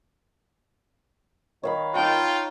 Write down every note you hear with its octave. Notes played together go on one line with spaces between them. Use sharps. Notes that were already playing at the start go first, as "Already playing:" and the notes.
D#3 C#5 F5 B5
D#4 F4 G5 A5